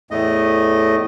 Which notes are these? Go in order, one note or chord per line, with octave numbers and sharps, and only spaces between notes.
E2 A2 A3 D#5